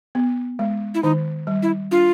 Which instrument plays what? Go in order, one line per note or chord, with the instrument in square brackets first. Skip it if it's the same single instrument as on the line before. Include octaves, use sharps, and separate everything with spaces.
[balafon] B3
G#3
[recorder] E4
[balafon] D#3 [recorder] D#4
[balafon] G3
[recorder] E4
[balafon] D4 [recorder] F4